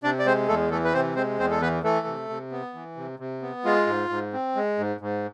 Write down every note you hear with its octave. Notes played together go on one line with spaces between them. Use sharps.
C3 D4 D5
D5
G#3 C4 C5
E2 A3 A4
E3 A3 A4
B4
C3 C4 C5
G#3 C4 C5
E2 C4 C5
A4
E3 B3 B4
E3 A3 A4
C3
C3
B3
E3
C3
C3
B3
G#3 F4
G#2
G#2
C4
G#3
G#2
G#2